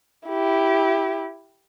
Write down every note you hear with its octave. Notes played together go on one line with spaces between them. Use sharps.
E4 G4